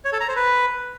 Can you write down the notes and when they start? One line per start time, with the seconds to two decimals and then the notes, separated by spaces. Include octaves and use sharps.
0.05 C#5
0.13 A4
0.20 A#5
0.28 C5
0.36 B4